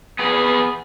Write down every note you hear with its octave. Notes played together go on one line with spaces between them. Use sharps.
B3 G#4